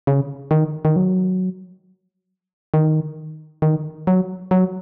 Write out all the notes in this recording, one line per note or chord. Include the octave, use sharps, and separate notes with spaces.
C#3
D#3
D#3
F#3
D#3
D#3
F#3
F#3